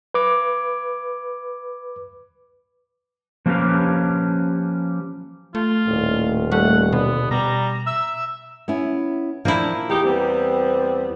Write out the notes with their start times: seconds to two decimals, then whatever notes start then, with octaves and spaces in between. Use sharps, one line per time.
0.14 B4 D6
3.46 F3 A#3 C#4 G4 B4 F5
5.55 A3 F4
5.87 D#1 A2
6.51 G3 A3 F#5
6.92 B2 D3 B3
7.31 B2 G3 A#5
7.86 E5 E6
8.68 B3 C#4 E4
9.45 A#2 F3 A#3 D4 E4
9.90 E2 D#4 G4
10.05 G3 B3 C4